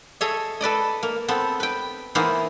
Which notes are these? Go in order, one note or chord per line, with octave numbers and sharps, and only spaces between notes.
G#4 A4 C#5 D#5 E5
A4 B4 D5 D#5
A#3
B3 C4 A4
B4 G5
E3 A#3 B3 D#4 G#4 C5